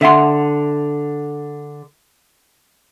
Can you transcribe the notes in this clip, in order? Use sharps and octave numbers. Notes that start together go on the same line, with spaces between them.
D3 E5 F#5 C6